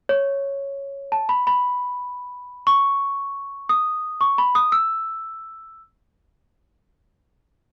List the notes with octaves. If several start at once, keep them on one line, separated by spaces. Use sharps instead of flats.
C#5
A5
B5
B5
C#6
D#6
C#6
B5
D#6
E6